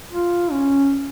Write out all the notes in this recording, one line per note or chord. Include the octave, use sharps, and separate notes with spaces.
F4
C#4